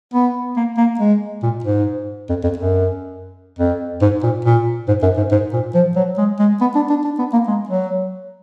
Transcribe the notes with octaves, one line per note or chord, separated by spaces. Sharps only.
B3
A#3
A#3
G#3
A#2
G#2
F2
F2
F#2
F2
G#2
A#2
A#2
G#2
F#2
G#2
G#2
A#2
F3
F#3
G#3
G#3
B3
D4
D4
D4
B3
A#3
G#3
F#3